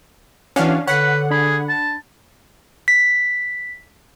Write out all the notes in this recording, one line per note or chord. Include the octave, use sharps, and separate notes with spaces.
E3 C#4 D4 F#4 F5 F#5
D3 B4 C#5 F#5
D4 G#4 B5
A5
B6